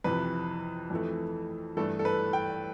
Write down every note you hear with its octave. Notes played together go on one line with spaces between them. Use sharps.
F2 C3 E3 B4
F2 E3 A3
G2 E3 A3 A4
A4
B4
G5